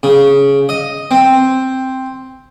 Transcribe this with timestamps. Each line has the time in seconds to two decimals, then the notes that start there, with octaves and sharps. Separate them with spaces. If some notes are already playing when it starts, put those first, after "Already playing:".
0.03 C#3
0.69 D#5
1.11 C4